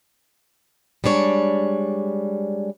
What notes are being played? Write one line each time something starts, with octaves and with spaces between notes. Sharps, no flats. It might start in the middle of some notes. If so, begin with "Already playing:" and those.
G3 G#3 D4 C#5